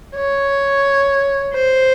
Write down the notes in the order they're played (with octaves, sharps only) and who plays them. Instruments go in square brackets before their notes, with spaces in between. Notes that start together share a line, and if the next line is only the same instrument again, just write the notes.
[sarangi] C#5
C5